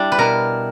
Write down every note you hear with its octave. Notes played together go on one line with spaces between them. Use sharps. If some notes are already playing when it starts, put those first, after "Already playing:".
Already playing: G3 D4 E4
B4
B2 A#4